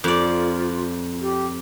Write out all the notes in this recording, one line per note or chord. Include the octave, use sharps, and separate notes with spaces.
F2 F4 D5
G4